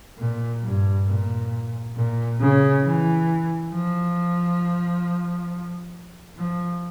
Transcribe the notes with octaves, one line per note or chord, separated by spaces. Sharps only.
A#2
G2
A#2
A#2
C#3
E3
F3
F3